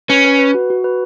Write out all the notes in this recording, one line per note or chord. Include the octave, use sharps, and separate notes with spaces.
C#4 B4
B4
B4
F#4
F#4
B4